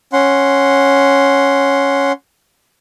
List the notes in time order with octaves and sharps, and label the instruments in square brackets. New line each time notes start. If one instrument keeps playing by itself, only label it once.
[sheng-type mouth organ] C#4 F#5 C6